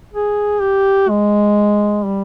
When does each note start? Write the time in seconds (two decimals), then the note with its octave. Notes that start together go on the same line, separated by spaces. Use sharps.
0.14 G#4
0.61 G4
1.09 G#3
2.06 G3